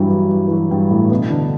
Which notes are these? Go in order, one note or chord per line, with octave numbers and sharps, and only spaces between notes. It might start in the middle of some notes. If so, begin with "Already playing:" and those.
Already playing: G2 E3 F#3 G3
F#3
F#3
E3
F#3
G2 G3
A2 A3
B2 B3
D3 D4